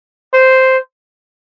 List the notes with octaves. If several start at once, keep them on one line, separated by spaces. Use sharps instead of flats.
C5